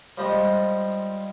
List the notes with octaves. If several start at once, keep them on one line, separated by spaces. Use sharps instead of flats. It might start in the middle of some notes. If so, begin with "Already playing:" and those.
F3 G3 G#3